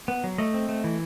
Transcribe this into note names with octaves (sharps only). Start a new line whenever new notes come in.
B3
F#3
A3 D#5
C4
A3
E3